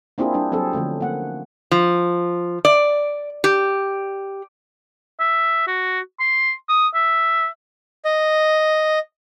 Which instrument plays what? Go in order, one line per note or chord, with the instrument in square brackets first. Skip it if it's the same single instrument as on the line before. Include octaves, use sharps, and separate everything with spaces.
[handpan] A#3 C4 D4 E4 F4 G#4
G3 D4 E4
F#3 C4 G#4 A4
D3 F3 A3 C#4
A#3 F#5
[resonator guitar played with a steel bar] F3
D5
G4
[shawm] E5
F#4
C6
D#6
E5
[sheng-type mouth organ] D#5